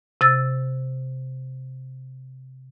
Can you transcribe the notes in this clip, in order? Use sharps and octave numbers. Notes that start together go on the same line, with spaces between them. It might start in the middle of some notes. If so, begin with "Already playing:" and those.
C3 E6 A6